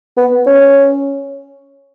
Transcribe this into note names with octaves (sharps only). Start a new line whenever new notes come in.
B3
C#4